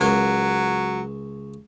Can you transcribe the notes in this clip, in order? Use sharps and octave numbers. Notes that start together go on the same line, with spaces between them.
C#2 F#3 A#4